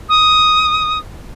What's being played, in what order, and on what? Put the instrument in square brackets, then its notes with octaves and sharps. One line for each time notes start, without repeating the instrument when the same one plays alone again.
[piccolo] D#6